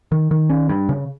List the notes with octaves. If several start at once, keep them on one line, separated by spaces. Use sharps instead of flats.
D#3
D#3
C#4
G2
C#3